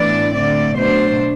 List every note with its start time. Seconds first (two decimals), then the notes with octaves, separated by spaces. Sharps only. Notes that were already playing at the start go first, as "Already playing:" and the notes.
Already playing: A2 E3 B3 D4 D5
0.33 D3 A3 C4 D5
0.75 B2 F#3 A3 D4 C5